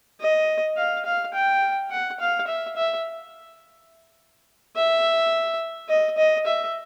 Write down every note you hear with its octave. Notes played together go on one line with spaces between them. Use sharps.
D#5
F5
F5
G5
F#5
F5
E5
E5
E5
D#5
D#5
E5